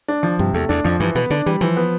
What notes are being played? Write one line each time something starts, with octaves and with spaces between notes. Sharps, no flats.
D4
F3
G2 C3
E2 A3
E2 D4
F2 F3
G2 E3
B2 B3
D3 D4
E3 G3
E3 F3
B3